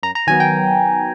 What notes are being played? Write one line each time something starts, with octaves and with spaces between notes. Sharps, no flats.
F#2 A#5
A#5
D#3 F#3 B3 G#5
G5